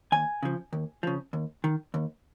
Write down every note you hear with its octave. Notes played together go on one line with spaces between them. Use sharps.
D#2 G#5
C#3 F3
D#2
C#3 F3
D#2
D#3
D#2